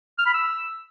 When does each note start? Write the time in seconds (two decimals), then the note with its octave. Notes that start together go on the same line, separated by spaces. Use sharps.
0.18 F6
0.26 B5
0.34 E6